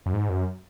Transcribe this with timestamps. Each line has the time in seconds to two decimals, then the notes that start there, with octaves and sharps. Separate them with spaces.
0.06 F#2
0.13 G#2
0.29 F#2